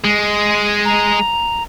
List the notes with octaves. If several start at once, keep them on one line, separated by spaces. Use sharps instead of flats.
G#3
A#5